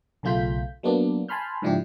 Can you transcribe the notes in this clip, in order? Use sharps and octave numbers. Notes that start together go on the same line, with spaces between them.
B1 C#3 A3 F4 G6 B6
F#3 A#3 B3 D4
G#5 A5 B5 C6 F6 G6
G#2 C#3 F3 D4 E4 G4